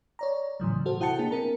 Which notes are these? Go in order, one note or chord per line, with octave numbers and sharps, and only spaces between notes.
C#5 D5 A#5
A2 C#3 E3 F#3
F#4 A4 C5
C3 E4 F#5 G5 A5 C#7
A#3 D4 E4 G#4
C4 A#4 A#5